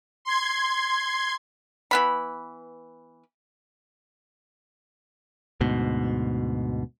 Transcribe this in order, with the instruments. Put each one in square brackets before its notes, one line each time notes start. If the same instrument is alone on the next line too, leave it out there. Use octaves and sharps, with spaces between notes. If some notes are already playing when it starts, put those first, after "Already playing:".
[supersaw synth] C6 G#6
[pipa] E3 B3 B5
[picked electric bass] D2 G#2 B2